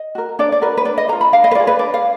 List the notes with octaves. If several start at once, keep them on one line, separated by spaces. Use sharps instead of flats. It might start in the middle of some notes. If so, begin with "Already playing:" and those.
Already playing: D#5
F#4 A#4
D4 D5
D5
F#4 A#4 B4
B4
D4 D5
D#5
F4 G#4 A#5
B5
D4 F5
D#5
B4
F4 G#4 D5
B4
D4 D5
F5